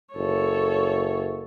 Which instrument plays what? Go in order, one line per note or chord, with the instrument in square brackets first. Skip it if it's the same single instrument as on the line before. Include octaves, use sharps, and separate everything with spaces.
[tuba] F#1 [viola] A4 C#5